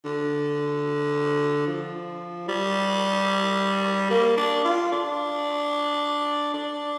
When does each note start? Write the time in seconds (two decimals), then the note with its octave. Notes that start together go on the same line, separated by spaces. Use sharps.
0.05 D3
1.67 F3
2.48 G3
4.10 A#3
4.37 D4
4.65 F4
4.92 D4
6.54 D4